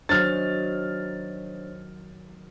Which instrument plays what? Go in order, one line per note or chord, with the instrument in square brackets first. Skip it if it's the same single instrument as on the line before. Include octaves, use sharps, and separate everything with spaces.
[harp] D#3 F#3 [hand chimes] D4 C5 C#5 [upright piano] F6 A6